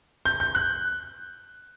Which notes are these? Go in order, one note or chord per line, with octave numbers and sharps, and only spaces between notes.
G6
G6
F#6